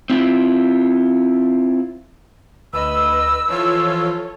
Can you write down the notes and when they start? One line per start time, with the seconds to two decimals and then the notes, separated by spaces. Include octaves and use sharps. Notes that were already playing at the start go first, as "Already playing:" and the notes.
0.10 C4 E4 F4
2.73 D2 B4 D#5 E6
3.48 E3 F3 F4 A4 C#5